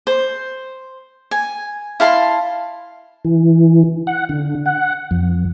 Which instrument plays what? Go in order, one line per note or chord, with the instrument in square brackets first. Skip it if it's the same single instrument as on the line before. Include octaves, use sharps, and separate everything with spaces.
[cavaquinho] C5
G#5
E4 F5 A5 C6
[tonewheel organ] E3
F#5
D3
F#5
F2